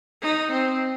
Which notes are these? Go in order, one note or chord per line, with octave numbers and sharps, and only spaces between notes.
D#4
C4